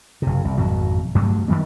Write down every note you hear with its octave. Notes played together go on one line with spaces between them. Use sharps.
F#1 C3
C2
G#1 F2 B2 F#3
G2 F#3 A3
D#3 F3 G3 B3